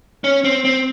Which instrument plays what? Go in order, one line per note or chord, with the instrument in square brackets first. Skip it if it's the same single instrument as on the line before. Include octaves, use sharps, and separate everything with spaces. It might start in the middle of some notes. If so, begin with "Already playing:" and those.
[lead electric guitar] C#4
C4
C4